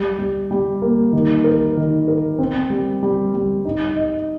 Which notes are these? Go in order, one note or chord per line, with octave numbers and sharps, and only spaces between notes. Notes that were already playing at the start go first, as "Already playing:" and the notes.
Already playing: G3
G3
G3
A#3
D#3
A#4
D#3
A#4
C4
G3
G3
G3
D#4
D#5